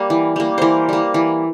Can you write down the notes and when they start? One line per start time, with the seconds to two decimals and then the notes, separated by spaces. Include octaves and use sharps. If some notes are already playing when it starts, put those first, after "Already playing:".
Already playing: G3 A#3 A#4
0.10 E3
0.36 G3 A#3
0.58 E3 A#4 C5
0.89 G3 A#3
1.14 E3